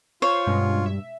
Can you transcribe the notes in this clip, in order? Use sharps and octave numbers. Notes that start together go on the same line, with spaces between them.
F4 C5 C#5
G2 B2 G#3 C#4
E5